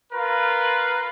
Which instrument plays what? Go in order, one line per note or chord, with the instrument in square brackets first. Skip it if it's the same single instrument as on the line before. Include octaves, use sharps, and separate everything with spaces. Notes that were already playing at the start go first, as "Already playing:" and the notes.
[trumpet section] F4 A#4 B4